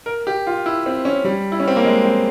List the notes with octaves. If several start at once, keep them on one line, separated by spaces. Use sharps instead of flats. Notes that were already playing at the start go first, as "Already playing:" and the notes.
A#4
G4
F4
E4
C4
C#4
G3
E4
C#4
C4
A#3
G#3
C4